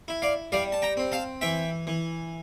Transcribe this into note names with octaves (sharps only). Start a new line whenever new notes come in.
E4
D5 F5
G3 D5 F5
A5
G5 A#5
C4
F5 A5
E3 E5 G5
E3